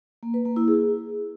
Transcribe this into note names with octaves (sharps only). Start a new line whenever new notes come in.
A#3
B4
A#3
E4
G#4